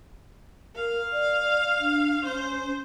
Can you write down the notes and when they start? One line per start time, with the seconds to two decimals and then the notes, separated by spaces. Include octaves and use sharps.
0.76 A#4 F5
1.13 D5
1.80 D4
2.25 C#4 C5